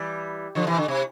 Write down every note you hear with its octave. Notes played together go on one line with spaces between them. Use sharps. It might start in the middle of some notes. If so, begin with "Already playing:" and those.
Already playing: E3 G3
D3 F3
C3 E3
D3
C3